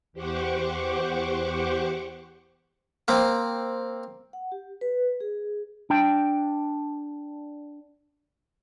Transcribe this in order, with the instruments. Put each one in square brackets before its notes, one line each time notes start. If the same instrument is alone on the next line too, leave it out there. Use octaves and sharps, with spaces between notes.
[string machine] E2 G4 C5 F#5 C#6 D6
[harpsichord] A#3 C4
[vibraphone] F#5
G4
B4
G#4
[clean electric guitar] D4 G5